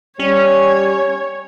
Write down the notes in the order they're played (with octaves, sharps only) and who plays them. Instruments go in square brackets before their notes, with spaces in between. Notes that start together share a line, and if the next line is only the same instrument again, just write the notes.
[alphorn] G3 [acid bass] C#4 [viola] C#5